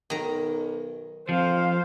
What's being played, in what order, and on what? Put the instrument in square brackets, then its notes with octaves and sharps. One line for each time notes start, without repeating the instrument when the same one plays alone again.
[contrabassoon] B1 [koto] D#3 A#5
[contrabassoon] F2 [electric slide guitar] F3 [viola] C5 F5